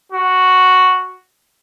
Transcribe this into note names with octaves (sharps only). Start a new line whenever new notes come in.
F#4